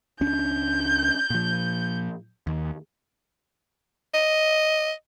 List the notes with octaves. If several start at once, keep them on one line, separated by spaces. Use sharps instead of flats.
C#2 C#4 D4 G6
A#2 F3
D#2
D#5